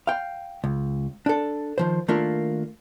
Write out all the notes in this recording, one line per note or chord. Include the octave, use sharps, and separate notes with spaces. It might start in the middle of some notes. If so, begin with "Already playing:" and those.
F5 G5
C#2
D4 A4
D#3 F3 C5
D#3 A3 A#3 D4 F4